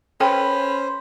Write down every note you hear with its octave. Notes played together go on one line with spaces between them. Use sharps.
C#4 A4 B4 C5 G5